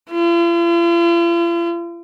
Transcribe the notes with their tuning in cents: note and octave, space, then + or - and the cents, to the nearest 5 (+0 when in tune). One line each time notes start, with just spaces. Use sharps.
F4 -45